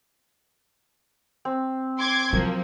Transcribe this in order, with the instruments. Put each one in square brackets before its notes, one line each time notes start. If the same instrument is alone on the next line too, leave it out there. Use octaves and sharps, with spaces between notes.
[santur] C4
[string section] C6 D6 G#6
[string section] F3 A#3 [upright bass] F#3